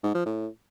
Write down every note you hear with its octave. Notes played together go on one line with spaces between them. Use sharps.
G#2
F3
A2